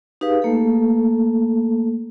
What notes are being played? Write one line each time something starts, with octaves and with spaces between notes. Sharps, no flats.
D#4 G4 G#4 B4 F5
A3 A#3 A4